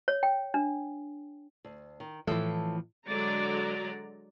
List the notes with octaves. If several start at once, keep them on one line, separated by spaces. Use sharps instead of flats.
C#5
G5
D4
D2
D#3
A2 E3 F3 A4 E5
D3 F#3 G#3 D5 A#5